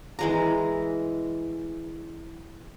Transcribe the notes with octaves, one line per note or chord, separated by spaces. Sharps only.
E3 G#3 A#5